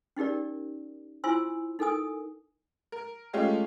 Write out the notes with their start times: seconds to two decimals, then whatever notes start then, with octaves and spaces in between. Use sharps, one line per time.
0.17 C#4 D#4 G4 A#4 D5
1.24 E4 F4 C5 G#5 C6 E6
1.79 D#4 A4 A#4 G#5 D#6
2.92 A#4
3.33 G#3 A3 C#4 F4 G4